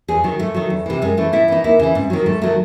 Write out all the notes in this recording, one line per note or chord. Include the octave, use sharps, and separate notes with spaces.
E2 G#4
D#3 F#3
G#2 A3
D#3 F#3
E2
C3 E3
F#2 G#3
E3 A3
A2 E4
E3 D#4
D#2 E4
C#3 E3 E4
G#2 C4
D#3 F#3
G#2 A3
D#3 F#3 A3